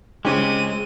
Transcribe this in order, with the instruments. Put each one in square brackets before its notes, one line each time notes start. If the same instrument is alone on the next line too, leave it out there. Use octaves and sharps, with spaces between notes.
[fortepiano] C#2 C#4 G4 [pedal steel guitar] G#3 [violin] C4 D#7